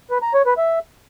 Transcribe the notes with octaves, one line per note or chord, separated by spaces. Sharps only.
B4
A#5
C#5
B4
E5